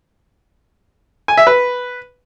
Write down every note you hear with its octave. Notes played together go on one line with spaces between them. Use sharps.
G#5
E5
B4